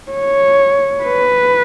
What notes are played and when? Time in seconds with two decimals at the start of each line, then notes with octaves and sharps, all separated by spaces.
0.12 C#5
1.03 B4